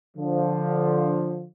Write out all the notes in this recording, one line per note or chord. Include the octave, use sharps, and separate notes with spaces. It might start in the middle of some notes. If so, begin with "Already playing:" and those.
D3 F3